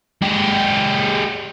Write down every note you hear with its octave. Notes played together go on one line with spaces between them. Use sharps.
G#3 G4